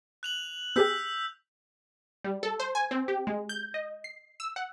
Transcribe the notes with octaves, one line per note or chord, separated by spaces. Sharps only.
F#6 F7 F#7
B3 G4 G#4 E6 G6 B6
G3
A4
C5
G#5
C4
G4
G#3
G6
D#5
C7
E6
F#5